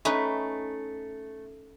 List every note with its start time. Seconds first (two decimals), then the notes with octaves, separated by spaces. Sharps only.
0.05 A3 C#4 D#4 B4